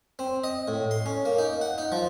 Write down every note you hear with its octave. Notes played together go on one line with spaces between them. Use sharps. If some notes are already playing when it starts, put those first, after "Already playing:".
C4
D#5
A2
C6
C#4
A#3
D#4
F#5
D#4
F3